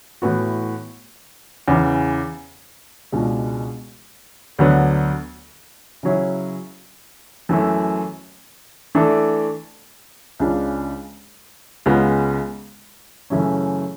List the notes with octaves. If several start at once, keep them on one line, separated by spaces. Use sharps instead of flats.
A2 E3 B3 F#4
E2 C#3 E3
C#2 B2 G#3 D4
D2 D3 F#3 B3
C#3 F#3 C#4 E4
F#2 E3 A3
E3 A3 D4 A4
C#2 C#3 G#3 D4
C#2 C#3 G#3 B3
F#2 C#3 E3 A3 C#4